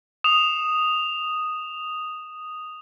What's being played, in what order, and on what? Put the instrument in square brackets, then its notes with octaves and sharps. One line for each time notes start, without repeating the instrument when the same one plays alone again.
[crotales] D#6 E7 F7